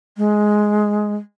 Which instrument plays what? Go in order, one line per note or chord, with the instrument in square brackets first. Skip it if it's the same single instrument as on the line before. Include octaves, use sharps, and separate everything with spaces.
[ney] G#3